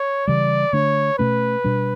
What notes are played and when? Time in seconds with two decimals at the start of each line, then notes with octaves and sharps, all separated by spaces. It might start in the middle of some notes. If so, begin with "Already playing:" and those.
Already playing: C#5
0.27 C#3 E3 G3 D5
0.73 D3 A3 D4 C#5
1.18 B2 A3 C#4 B4
1.64 B2 G3 D4